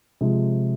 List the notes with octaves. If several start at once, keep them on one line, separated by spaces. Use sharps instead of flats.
C3 F3 G#3